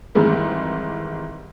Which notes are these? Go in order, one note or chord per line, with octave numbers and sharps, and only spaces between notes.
F2 G#2 D#3 E3 G3 G#3